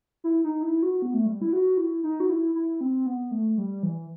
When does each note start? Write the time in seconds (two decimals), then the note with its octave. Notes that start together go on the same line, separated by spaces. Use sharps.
0.24 E4
0.44 D#4
0.63 E4
0.83 F#4
1.02 B3
1.14 A3
1.26 G3
1.41 E4
1.53 F#4
1.77 E4
2.04 D#4
2.20 F#4
2.30 E4
2.55 E4
2.81 C4
3.06 B3
3.31 A3
3.57 G3
3.83 E3